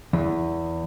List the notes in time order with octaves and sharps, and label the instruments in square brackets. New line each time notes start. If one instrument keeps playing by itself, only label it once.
[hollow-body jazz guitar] E2